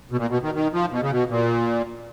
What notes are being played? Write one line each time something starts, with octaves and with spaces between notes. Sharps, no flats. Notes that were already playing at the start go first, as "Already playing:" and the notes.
B2
A#2
B2
D#3
D#3
F3
B2
C#3
B2
A#2